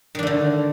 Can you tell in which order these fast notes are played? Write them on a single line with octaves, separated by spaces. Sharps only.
D#3 D4 A3 D3